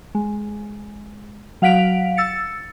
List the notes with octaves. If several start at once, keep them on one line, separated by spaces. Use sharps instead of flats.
G#3
F#3 F5 F#5 B6 D7 F7
E6 A6 C#7